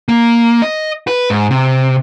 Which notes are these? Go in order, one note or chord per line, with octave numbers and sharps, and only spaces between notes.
A#3
D#5
B4
G#2
C3